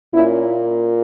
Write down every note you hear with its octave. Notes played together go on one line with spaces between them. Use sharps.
A#2 A#3 C#4 E4